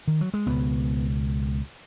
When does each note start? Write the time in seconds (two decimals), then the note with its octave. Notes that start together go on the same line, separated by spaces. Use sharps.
0.08 D#3
0.21 F#3
0.34 G#3
0.46 C#2 B2 B3